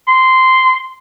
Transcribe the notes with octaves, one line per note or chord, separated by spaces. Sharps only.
C6